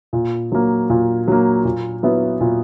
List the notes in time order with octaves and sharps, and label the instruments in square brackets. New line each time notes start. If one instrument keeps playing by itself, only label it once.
[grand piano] A#2
F#3 A#3
A#2
F#3 A#3
A#2
F#3 B3 E4
A#2